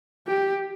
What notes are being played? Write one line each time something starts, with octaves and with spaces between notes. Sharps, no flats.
G4